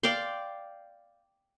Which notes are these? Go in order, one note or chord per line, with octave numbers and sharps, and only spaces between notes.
D5 F5 G5 C6